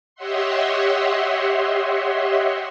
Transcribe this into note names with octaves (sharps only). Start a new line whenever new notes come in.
G4 C#5 D#5 E5 F#5 C6